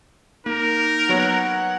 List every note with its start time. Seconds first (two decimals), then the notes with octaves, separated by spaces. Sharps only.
0.46 A#3 D#4 A#4
1.09 F#3 B3 C#5 F#5